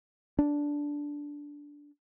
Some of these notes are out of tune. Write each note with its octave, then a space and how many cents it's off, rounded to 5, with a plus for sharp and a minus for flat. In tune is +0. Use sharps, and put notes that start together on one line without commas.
D4 -10